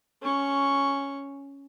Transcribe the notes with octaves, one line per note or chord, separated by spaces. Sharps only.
C#4 C#6